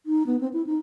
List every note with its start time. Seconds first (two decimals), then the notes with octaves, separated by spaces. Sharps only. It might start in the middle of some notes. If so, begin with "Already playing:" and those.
0.06 D#4
0.27 B3
0.41 C4
0.53 E4
0.67 D#4